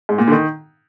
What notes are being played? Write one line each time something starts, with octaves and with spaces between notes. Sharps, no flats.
G#2
A#2
D3
D#3